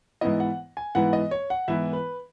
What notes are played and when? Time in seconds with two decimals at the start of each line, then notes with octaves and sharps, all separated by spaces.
0.21 G#2 E3 B3 E4 D#5
0.40 F#5
0.77 G#5
0.95 G#2 E3 B3 E4 F#5
1.13 D#5
1.31 C#5
1.50 F#5
1.68 G#2 E3 B3 E4 E5
1.93 B4